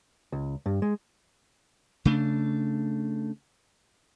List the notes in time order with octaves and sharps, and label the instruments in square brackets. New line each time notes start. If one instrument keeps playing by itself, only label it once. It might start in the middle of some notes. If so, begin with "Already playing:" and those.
[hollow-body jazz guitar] C#2
G2
G#3
[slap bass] C#3 A3 D4